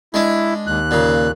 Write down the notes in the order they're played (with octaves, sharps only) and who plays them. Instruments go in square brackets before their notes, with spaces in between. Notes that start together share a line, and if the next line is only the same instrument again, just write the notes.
[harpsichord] G#3 D4 [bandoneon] E4
[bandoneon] D#2 F#6
[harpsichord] A#2 C#3